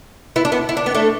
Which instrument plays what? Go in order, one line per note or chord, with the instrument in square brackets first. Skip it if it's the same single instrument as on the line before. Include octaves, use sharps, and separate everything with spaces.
[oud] B3 E4
D4
B3 E4
E4
D4
B3
A3 D4